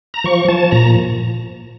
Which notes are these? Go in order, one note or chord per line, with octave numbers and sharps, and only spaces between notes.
A#5
F3 C#6
F3 A5
A#2 A#5